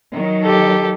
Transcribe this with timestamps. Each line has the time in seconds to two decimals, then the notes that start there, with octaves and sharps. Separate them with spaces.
0.13 D#3 F#3
0.44 G4 A4